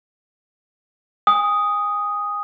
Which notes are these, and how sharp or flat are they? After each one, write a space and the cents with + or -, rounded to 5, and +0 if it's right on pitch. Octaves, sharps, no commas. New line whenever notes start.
G#5 -30 D#6 +0